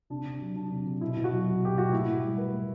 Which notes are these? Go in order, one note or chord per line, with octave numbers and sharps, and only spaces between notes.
C3 D4
C3
F#3
F#3 D4
C3
C3
B2 E4
B2
F#4
F#3
F#3
B2 G4
B2 F#4
A2 E4
A2
G3
G3 B4
A2